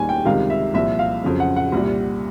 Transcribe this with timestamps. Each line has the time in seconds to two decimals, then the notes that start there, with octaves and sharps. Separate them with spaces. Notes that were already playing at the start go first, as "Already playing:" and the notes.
Already playing: D#2 D#3 G3 G#5
0.09 G5
0.25 C#2 C3 D#3 G3 F5
0.50 E5
0.74 C2 A#2 F3 E5
0.99 F5
1.24 F2 C#3 F#3
1.40 F#5
1.56 F#5
1.72 C2 A#2 G3